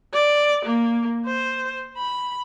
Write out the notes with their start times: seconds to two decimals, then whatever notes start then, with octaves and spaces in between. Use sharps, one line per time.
0.14 D5
0.65 A#3
1.26 C5
1.97 B5